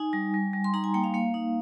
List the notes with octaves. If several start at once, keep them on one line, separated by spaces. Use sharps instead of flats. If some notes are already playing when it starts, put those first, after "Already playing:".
Already playing: D#4 G#5
G3
G3
G3
C6
D#4 A#5
G#5
A#3 G5
F5
A#3 F5
D#4